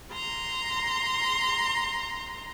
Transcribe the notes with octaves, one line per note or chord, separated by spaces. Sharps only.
A#5 C6